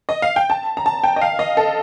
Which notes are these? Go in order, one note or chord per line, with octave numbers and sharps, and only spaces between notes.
D#5
F5
G5
A5
A#5
A5
G5
D#5
F5
D#5
A4